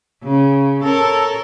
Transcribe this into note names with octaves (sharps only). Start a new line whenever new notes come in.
C#3
A4 A#4 C#5